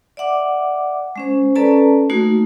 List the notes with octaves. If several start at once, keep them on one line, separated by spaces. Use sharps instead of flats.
D5 E5 F#5 D6
G#3 C#4 C5
C#4 A4 B4 D5 A5 A#5
A3 A#3 D#4 F#4